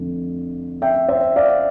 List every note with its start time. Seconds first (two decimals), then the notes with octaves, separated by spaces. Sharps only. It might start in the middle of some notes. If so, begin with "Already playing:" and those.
Already playing: F2 D3 A3
0.82 E5 G5
1.08 C5 E5
1.36 D5 F5